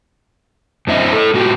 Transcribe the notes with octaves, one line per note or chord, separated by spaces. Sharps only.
F#2 C4 E4 D#5
E4 A4
A2 F#4 G4